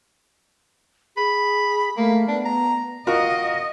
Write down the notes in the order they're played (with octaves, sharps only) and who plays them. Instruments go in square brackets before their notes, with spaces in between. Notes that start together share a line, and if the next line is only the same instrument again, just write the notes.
[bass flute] G#4 [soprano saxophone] B5
[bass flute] A3 [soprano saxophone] A#3
[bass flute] B3 [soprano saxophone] D4
[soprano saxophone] A#5
[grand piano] F4 F#4 A#4 [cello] D#5